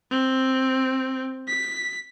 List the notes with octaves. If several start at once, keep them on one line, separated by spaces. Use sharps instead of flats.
C4
B6